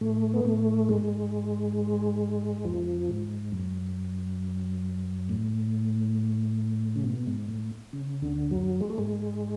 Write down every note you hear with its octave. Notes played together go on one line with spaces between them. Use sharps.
A2 A3
B3
A2 A3
G#2 G#3
F2 F3
G#2
F#2
A2
C#3
B2
G#2
A2
C#3
D2 D3
F#2 F#3
G#3
A3
G#2 G#3